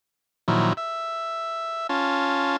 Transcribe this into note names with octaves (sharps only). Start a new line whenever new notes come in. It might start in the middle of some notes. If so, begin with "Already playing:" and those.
A#2 D#3 F3 F#3 E4
E5
C#4 F4 A5